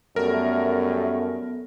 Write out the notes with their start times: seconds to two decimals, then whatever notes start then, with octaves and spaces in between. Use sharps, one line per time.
0.16 F#2 G3 A3 B3 A4 A#4